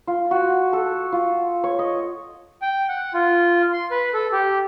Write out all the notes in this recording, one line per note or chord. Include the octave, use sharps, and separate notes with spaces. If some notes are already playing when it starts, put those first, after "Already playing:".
F4
F#4
A4
F4
C#5
D#5
G5
F#5
F4
C6
B4
A4
G4